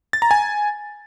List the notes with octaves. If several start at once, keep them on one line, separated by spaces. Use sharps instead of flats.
A6
A#5
G#5